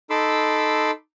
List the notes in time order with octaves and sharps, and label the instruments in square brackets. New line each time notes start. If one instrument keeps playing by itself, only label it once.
[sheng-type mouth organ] D#4 A4 B5 C6 D6 E6